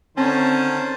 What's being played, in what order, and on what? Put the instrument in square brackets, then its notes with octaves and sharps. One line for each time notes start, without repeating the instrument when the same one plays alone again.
[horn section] D3 C#4 [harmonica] D#3 C5 A5 [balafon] C4